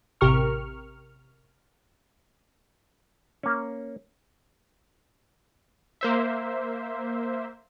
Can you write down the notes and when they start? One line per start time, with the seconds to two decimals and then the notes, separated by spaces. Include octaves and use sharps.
0.21 A1 C3 G4 A#4 C#6 F6
3.43 A#3 C#4
6.01 A#3 C5 E5